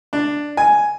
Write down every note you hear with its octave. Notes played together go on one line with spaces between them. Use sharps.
D4
G#5